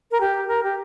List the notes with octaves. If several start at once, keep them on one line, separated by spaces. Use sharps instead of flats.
A#4
G4
A#4
G4